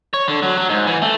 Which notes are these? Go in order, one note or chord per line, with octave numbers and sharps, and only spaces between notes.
C#5
D3
F#3
F#3
G#2
E3
A3